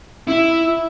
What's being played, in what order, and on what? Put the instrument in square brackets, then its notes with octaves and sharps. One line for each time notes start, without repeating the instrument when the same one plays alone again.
[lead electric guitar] E4